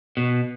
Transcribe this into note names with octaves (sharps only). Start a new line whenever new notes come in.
B2